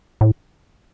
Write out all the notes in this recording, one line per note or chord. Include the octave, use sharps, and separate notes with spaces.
A2